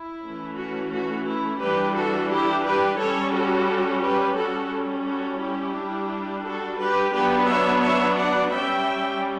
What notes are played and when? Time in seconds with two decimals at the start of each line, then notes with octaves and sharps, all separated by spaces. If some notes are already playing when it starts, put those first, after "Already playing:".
Already playing: E4
0.24 E3 A3 C#4
0.58 F#4
0.93 F#4
1.27 E4
1.61 E3 G3 D4 G4 B4
1.96 F#4 A4
2.31 E4 G4
2.65 G4 B4
2.99 G3 C#4 A4 C#5
3.35 F#4 A4
4.03 G4 B4
4.37 G3 C#4 F#4 A4
5.07 F#4 A4
5.41 E4 G4
5.75 G3 D4
6.44 F#4 A4
6.80 G4 B4
7.13 F#3 B3 D4 G4 B4
7.48 C#5 E5
7.82 C#5 E5
8.17 D5 F#5
8.51 G3 C#4 E5 G5